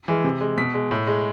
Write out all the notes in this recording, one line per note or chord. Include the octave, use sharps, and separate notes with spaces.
E3 G#3
C3
G#3
B2 B6
G#3
A2
G#3